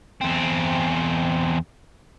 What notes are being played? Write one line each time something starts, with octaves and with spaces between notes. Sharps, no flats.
E2 C4